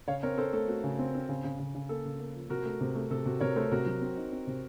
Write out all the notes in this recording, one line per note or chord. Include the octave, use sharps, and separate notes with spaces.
C#3 C#5 F5
C4 A#4 C#5
C4 A4 C5
A3 A4
A3 F#4
C#3
C4
C4
C#3
C#3
C#3
C#3
A#3 A4
C#3
A#3
F3
C3 F#4 A#4
A3
C3
A3
C3 A4
C3 F#4
C3 A#4 C#5
A3 A4 C5
C3 F#4 A#4
F#3
C4
D#4
C4
C3